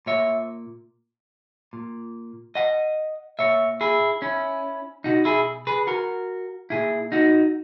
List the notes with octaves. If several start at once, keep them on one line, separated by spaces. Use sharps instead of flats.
A#2 C#5 E5
A#2
D#5 F#5
A#2 C#5 E5
E4 G#4
C#4 E4
B2 D#4 F#4
E4 G#4
G#4 B4
F#4 A#4
A#2 E4 G#4
D#4 F#4